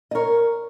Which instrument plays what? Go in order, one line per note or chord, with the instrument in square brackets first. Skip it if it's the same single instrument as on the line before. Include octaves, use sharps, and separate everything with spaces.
[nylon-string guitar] D#5
A#4 C#5